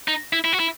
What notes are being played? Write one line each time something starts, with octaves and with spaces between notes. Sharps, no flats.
D#4
E4
E4
F#4
E4